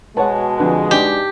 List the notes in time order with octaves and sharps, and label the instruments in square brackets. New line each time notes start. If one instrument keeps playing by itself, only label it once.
[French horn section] B2 G#3 [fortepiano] B4 C#5 F#5 [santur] A5
[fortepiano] F2 D3 B4
[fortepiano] D4 D#4 [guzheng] G4